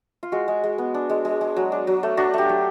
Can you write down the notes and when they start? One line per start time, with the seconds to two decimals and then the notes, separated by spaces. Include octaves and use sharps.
0.23 F4
0.32 G#3 F#4
0.48 G#3
0.64 G#3
0.78 B3
0.94 D4
1.10 G#3
1.25 G#3
1.41 G#3
1.56 F#3
1.72 D4
1.87 F#3
2.03 A3
2.17 D4 F#4
2.34 A3 G4
2.49 F#3